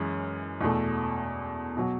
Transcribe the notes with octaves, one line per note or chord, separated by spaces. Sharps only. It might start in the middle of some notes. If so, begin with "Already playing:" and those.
Already playing: F#2 E3 G#3 C#4
E2 B2 A3
B2 F#3